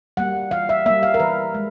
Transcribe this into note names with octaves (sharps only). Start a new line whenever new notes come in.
G3 A#3 F#5
E3 F5
E5
G3 A#3 E5
F5
A#4
E3 B4
G#3